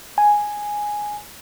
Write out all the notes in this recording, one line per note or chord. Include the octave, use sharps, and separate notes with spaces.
G#5